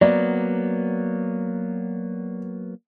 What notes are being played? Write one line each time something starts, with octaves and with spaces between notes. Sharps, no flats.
F#3 A#3 B3 D5